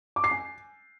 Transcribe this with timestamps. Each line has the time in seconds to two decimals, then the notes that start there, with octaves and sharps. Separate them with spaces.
0.16 D6
0.24 C7
0.31 G#5